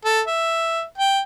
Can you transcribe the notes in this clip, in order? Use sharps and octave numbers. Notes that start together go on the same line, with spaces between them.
A4
E5
G5